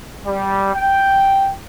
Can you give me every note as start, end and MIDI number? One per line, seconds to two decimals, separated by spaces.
0.25 0.70 55
0.73 1.52 79